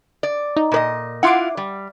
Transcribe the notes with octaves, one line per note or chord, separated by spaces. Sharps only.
D5
D#4
A#2 B4 D#5
E4 F4 F#5 C6 D6
G3